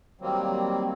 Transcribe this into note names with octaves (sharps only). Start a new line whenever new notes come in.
D#3 F#3 G3 A#3 C4